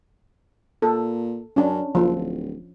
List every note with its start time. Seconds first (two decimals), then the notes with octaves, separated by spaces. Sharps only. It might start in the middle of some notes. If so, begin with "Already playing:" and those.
0.82 A#2 A4
1.56 F#2 C#4 D4
1.95 F#1 F3
2.16 D1